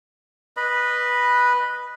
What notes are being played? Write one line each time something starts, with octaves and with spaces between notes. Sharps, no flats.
B4 D#5 B5